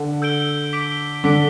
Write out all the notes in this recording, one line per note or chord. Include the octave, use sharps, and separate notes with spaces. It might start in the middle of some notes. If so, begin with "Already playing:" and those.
Already playing: D3
E6 G6 D7 G7
D6 B6 D7 G7
D3 D6 B6 D7 G7